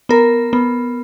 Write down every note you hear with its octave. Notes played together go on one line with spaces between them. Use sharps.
B3 A#4
B3